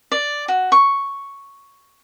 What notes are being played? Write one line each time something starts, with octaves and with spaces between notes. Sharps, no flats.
D5
F#4
C#6